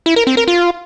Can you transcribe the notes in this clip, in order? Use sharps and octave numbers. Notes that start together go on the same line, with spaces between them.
E4
A#4
C4
A#4
F4